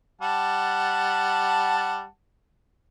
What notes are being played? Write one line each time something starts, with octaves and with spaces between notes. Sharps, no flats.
G3 F#5 A5